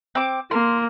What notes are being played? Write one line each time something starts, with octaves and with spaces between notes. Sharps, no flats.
C4 D6
A#3 C6